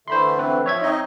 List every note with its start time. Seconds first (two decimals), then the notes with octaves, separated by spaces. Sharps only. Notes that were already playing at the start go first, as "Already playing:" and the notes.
0.08 D3 E3 A3 C5 B5 C6
0.39 C4 B4
0.66 F3 C#5 E5 G#6
0.82 C4 D#4 D#5